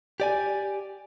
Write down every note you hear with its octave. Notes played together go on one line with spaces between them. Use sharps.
G4 D5 G#5